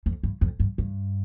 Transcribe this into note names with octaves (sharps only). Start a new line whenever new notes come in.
F2
G2
F2
G2
G2